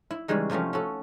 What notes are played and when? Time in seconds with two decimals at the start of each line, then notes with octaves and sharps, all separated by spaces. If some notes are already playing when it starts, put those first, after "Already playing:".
0.11 E4
0.28 C#3 E3 G3 G#3 D#4
0.50 C3 F3 A3 C4 C#4
0.73 C#4 F#4 A4